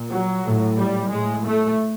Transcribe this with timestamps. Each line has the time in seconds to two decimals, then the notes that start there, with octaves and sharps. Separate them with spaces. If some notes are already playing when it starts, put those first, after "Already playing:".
Already playing: A#2
0.10 F#3
0.44 A2
0.79 G3
1.12 A2 G#3
1.47 A3